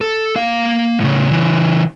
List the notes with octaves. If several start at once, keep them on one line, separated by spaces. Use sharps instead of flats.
A4
A#3 F5
A2 C#3
C#3 E3